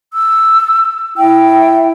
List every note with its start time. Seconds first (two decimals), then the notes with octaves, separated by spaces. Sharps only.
0.14 E6
1.18 E4 G5